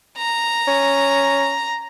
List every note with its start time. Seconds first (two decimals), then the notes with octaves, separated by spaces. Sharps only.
0.17 A#5
0.67 C#4